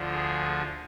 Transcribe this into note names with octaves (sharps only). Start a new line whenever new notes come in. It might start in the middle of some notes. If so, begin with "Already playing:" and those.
Already playing: D2 D3 F3
G#4